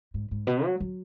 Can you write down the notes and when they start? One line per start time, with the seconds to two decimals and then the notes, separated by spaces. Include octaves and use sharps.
0.14 G#2
0.31 G#2
0.47 B2
0.65 F#3
0.80 F#3